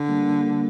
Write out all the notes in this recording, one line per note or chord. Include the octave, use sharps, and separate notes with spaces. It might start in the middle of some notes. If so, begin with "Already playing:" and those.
Already playing: D3
G3 A#3